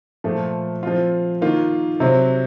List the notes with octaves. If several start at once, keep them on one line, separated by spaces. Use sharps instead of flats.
A#2 F3 A3
F3 C4 F4
D#3 A#3 F4
C3 F#3 C4